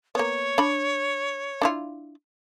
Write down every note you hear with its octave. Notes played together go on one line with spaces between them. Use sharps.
A#3 B3 C#5
D4 B5
D4 E4 F4